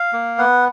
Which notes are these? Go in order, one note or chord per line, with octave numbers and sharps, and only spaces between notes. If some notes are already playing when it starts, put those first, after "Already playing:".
Already playing: F5
A#3
B3 F#5